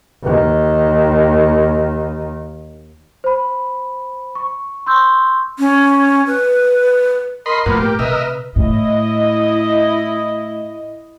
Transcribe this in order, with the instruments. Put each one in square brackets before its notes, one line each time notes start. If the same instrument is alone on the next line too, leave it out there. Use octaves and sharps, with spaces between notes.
[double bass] D#2 D#3
[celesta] C5 B5
C#6
C6 C#6 E6 G6
[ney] C#4
B4
[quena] A#4 [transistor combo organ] D#5 B5 C6
[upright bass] A2 [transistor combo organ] F3 A#3 B3
[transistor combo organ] G4
[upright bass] C3 [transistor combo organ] A#4 D#5 E5 [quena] B4
[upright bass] A2 [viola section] E4 D#5